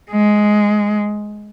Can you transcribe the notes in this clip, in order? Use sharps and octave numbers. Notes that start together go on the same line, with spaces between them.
G#3